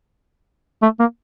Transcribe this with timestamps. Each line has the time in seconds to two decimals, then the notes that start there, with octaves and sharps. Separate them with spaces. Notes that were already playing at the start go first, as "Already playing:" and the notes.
0.82 A3
0.99 A#3